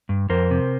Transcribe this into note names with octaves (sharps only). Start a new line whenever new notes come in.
G2
F2 A#4 C5
C3